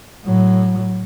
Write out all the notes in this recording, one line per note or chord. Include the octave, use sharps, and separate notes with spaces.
A2 F#3